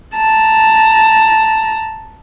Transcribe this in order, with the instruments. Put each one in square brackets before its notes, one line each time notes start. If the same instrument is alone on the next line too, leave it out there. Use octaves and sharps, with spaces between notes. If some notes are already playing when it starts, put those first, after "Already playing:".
[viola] A5 A#5